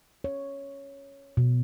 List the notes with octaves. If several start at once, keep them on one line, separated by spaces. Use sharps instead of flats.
C#5
B2